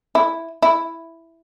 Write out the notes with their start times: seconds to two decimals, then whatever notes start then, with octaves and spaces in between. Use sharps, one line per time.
0.15 E4
0.62 E4